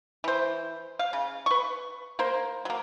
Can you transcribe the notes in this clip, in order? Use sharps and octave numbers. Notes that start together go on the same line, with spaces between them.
E3 C5
F5
C#3
B4 C#6
A#3 A#4 C5
F#3 A#3